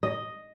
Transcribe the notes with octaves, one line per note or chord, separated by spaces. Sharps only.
D#5